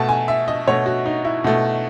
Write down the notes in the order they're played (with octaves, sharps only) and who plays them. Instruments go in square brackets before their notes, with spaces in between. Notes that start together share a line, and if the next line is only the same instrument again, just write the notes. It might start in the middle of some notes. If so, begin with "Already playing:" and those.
Already playing: [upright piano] B2 A3 A5
G#5
E5
D#5
B2 A3 C#5
F#4
D#4
E4
B2 A3